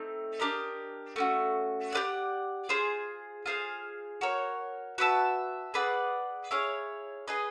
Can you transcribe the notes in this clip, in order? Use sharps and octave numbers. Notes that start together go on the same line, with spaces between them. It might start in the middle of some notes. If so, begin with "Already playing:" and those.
Already playing: A3 C4 D#4
D4 G4 A#4 D#5
A3 C#4 F#4
G4 B4 D5 F#5
F4 G#4 C5
F4 G#4 C5 F5
F#4 A#4 C#5
F#4 B4 E5 A5
G#4 B4 D5 F#5
E4 G#4 C#5 F5
G#4 B4 D#5 G#5